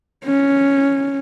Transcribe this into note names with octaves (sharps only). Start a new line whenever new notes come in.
C#4